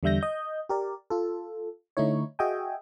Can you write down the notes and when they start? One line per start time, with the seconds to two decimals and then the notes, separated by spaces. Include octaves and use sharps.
0.03 E2 D3 G3 E5 G6 A#6
0.21 D#5 G6
0.69 G4 A#4 D5
1.10 F4 A4
1.97 D3 A3 D#4 E4 C#5
2.39 F#4 G#4 D#5 E5 G5 G#5